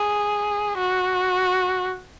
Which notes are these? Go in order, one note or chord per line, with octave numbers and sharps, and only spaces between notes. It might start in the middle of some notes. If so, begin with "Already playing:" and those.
Already playing: G#4
F#4